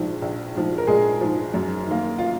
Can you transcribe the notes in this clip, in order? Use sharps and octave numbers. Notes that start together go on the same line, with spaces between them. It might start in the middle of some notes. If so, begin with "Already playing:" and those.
Already playing: A#1 G#2 F3
A#1
G#2 F3
A#4
A#1 G#3 G#4
G#2 F3
F#2
D#3 A#3
F4